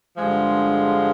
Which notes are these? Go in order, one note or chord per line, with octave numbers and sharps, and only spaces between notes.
G2 D3 F3 G#3